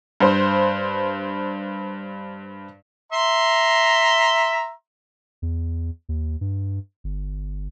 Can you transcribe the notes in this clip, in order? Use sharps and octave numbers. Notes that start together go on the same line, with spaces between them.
G2 C5
E5 A#5 C6
E2
D#2
G2
G1